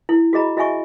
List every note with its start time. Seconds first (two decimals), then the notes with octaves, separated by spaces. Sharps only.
0.09 E4
0.33 F#4 G#4 D#5 A#5 B5
0.57 F#4 D#5 E5 G#5 C#6